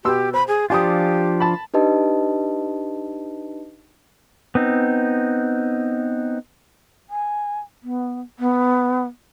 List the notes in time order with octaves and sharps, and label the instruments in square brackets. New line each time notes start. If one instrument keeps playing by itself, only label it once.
[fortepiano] B2 C6 E6 [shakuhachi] G4
[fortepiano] C5 [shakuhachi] B5
[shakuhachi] G#4
[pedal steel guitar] F3 D4 F4 [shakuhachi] G4 [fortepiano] G#5 D#6
[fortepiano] A5 B5
[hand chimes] D4 D#4 G4 B4 D#5 A5
[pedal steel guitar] B3 C4 D#4
[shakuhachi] G#5
B3
B3